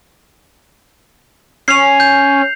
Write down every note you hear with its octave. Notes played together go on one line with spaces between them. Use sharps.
C#4 C7 F7
G6